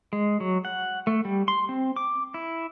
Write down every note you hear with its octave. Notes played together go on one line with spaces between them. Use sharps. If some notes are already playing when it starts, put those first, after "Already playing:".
G#3
F#3
F#5
A3
G3
C6
C4
D6
E4